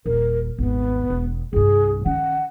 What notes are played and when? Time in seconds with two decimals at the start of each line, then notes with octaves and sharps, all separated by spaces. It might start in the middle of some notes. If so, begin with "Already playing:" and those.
0.06 D#1 A#4
0.58 G#1 D#2 B3
1.10 E1
1.53 C2 G2 G#4
2.05 D#3 C#4 F#5